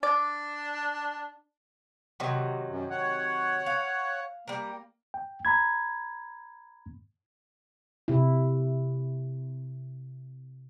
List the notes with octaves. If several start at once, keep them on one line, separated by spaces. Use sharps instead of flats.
D4 D5
C3 D#3 F#3
F#2
C#5 F#5
F5
G3 A#3 A#4
G5
A#5 B5 G#6
C3 E4